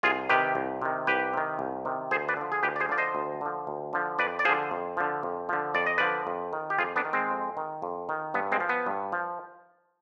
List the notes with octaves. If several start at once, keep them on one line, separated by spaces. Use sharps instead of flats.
C2 F4 G#4
C3 D#3 G4 B4
C2
C3 D#3
C2 G4 B4
C3 D#3
C2
C3 D#3
D2 G#4 C5
B4 D5
D3 F3
G#4
D2 G4 B4
D5
G#4 C5
D3 F3 D5
C5 D#5
D2
D3 F3
D2
D3 F3
F2 B4 D5
D5
D3 F3 G#4 C5
F2
D3 F3
F2
D3 F3
F2 D5
D#5
D3 F3 B4 D5
F2
D#3
G4
F2 F4 G#4
B3 D4
D#3
G#3 C4
F2
D#3
F2
D#3
G2 B3
G#3 C4
F3
B3
G2
F3